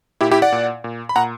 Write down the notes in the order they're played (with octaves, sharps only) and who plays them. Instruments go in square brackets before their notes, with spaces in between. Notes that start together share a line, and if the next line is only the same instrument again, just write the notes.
[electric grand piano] A#2 E4 G4
E4 G4
D5 F#5
A#2
A#2
B5
A#2 F#5 A#5